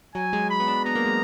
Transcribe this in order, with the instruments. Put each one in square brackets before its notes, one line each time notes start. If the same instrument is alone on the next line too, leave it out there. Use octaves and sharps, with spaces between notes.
[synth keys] F#3 [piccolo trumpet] G#5
[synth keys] G#3
[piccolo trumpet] B5
[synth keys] B3
D4
[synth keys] B3 [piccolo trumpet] A#5
[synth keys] A#3
G#3